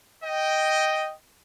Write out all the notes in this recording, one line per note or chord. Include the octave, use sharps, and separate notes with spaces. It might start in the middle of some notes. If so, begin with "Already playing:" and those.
D#5 G5